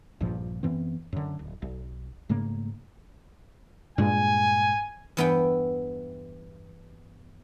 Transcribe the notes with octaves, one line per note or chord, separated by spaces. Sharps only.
A#1 G2 A#2 F3
F#2 E3 B3 C4
F#2 D3
D1
B1
G#2 C#3 A3 A#3
G2 A#2 G#3 G#5
E2 G2 B3 E5 F#5 G5